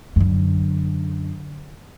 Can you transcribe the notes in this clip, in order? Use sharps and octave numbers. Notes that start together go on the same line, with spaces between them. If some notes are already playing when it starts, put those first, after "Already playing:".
F#2 D3